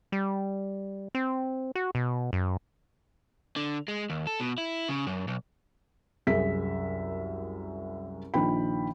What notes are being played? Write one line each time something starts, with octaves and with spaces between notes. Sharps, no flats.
G3
C4
F#4
B2
F#2
D3
G#3
D#2
A4
B2
E4
C#3
F#2
B1
C2 F#2 G#4 E5 B6
A#1 D#3 F4 G5 B5